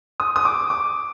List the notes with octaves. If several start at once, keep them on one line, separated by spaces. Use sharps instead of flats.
D#6
D#6
D6
D6